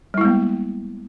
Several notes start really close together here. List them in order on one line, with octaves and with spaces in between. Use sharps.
G3 E4 G#3 B3 A#3